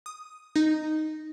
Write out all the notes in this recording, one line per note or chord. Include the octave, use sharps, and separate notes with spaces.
D#6
D#4